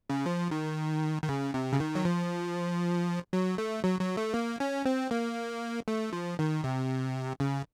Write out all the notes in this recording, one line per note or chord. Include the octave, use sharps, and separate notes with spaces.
C#3
F3
D#3
D#3
C#3
C3
C#3
D#3
F#3
F3
F#3
A3
F#3
F#3
A3
A#3
C#4
C4
A#3
A3
F3
D#3
C3
C#3